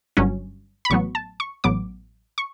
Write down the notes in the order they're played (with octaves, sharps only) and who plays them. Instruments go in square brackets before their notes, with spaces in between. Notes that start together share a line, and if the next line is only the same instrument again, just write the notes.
[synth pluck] G1 G2 F#3 C#4
B5
A1 A2 F#3 B3 C#6
A5
C#6
A1 A2 F#3 B3 D6
C#6